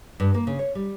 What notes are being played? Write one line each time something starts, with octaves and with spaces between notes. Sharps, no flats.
G2
A#3
C#3
C#5
G3